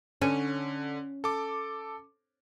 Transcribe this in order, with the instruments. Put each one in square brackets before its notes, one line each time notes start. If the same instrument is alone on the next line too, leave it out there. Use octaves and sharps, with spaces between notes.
[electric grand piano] D3 [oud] C#4
[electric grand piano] A4 D6